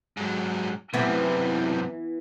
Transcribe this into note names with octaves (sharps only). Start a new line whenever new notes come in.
G#2 F#3
F#2 C3 E3 B3